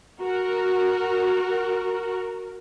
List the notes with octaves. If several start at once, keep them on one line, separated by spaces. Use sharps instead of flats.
F#4 A#4